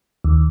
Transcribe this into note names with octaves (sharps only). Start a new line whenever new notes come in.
D#2